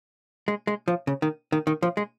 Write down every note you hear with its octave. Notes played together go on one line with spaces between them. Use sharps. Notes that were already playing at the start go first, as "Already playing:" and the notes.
G#3
G#3
F3
C#3
D#3
D#3
D#3
F3
G#3